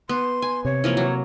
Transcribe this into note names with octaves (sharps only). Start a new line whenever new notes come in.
B3 C6
G#5
C3 C#5
E3 F3 A#3
F#3